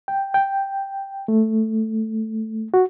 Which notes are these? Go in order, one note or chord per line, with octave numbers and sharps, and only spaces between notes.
G5
G5
A3
F#4